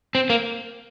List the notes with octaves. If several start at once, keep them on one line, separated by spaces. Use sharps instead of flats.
C4
A#3